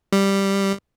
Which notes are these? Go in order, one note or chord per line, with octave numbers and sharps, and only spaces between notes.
G3